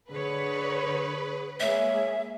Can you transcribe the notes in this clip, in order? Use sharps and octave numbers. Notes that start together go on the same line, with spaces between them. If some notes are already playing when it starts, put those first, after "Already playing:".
D3 G#4 B4 C#5
G#3 A#3 G#4 C#5 E5